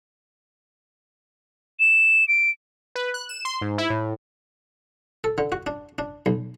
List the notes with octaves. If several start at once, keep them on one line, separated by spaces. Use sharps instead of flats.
E7
D7
B4
F#6
E7
C6
G#2
E4
A2
A4
D3
F#4
D4
D4
B1